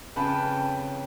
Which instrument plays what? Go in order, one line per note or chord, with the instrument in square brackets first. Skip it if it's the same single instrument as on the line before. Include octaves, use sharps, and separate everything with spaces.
[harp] F2 C#3 C#4 [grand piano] B4 A5 B5 [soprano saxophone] G5